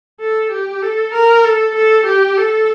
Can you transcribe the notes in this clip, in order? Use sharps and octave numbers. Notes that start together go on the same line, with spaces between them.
A4
G4
A4
A#4
A4
A4
G4
A4